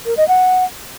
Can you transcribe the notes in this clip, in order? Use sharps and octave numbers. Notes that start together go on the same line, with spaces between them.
A#4
D#5
F#5